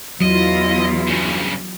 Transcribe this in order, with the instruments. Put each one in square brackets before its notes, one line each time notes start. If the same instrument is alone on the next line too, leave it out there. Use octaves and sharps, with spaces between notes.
[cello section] E2 E4 F4 [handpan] F#3 [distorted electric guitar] D#5
[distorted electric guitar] G2 C#3